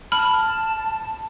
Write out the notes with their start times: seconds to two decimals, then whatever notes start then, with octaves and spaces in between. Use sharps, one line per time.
0.12 A5 B5 F6